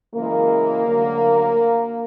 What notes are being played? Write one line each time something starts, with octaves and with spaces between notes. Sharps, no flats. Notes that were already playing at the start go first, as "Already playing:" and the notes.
F#2 C#3 E3 G#3 A#3
D2 D3 F#3